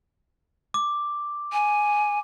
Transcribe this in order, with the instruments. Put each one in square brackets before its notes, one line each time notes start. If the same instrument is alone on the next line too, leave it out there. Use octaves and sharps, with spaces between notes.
[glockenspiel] D6
[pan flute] G#5